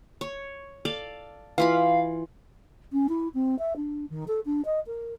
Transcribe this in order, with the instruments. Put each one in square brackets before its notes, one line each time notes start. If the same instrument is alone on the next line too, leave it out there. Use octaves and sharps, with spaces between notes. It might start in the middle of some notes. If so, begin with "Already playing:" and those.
[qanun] C#5
A4 D5 F5
[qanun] E3 F4 B5 [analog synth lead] F5
[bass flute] C#4
E4
C4
E5
D4
D#3
A4
D4
D#5
A#4